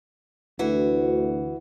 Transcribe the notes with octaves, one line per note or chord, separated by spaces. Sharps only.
D2 E3 F#4